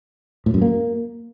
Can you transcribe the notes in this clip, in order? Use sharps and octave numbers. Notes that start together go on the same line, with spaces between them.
A2
F#2
A#3